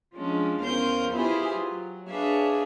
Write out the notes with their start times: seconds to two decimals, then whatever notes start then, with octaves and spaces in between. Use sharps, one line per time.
0.16 F3 G#3 C#4 D4 F4
0.62 E2 C#4 A#4 C5 F5 G6
1.14 E4 F4 G4 G#4 B4 C5
1.55 F#3
2.09 D4 G#4 B4 C#5 E5 F5